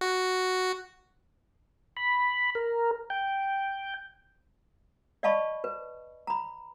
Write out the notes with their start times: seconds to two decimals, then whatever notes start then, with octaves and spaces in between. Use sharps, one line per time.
0.01 F#4
1.97 B5
2.55 A#4
3.10 G5
5.23 D5 D#5 F5 A5 B5 C#6
5.64 B4
6.27 A#5 B5